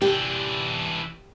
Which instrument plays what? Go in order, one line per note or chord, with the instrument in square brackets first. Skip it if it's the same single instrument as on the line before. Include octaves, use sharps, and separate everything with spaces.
[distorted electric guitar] E3 D4 [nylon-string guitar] G4